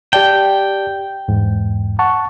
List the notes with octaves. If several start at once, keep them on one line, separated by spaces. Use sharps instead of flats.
G4 D5 G5 A5
E2 G#2
F#5 A5 C#6